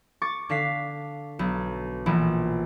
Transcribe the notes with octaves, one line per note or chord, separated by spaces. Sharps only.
C#6 D6 A6
D3 D4 F5 B6 C7
B1
A#1 B2 E3 D7